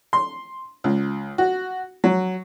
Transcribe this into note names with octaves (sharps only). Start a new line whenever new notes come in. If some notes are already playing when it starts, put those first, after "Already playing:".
C6
C#2
F#4
F#3